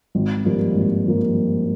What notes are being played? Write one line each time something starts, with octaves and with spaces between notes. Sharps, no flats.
G#1
G2 F3 A#3
G#1
G2 F3 A#3